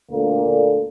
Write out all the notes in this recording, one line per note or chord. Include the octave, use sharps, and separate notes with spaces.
D2 A#2 D3 A#3
D2 D3